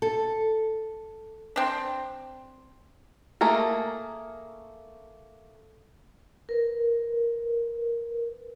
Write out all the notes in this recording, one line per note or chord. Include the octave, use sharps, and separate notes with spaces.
A4
C4 D4
A3 A#3 G#4 A#4
A#4 B4